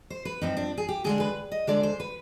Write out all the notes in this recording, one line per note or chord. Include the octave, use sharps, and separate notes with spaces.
C5
B4
G2 F3 C4 D#4
D4
G#4
G4
D3 G#3 D4 G#4
B4
D#5
D3 G#3 D4 D5
C5
B4